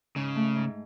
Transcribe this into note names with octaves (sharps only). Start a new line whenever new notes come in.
G#2 C#3
A3
G#2